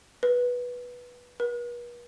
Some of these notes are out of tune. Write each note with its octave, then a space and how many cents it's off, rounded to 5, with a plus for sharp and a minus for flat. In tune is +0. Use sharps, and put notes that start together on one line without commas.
B4 -10
B4 -45